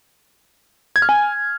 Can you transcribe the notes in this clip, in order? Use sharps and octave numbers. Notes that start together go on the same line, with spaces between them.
G#6
F6
G#5